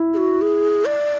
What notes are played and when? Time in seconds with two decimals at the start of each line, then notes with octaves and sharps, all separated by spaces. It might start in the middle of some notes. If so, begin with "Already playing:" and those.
Already playing: E4
0.14 G#4
0.17 F#4
0.42 G#4
0.85 D5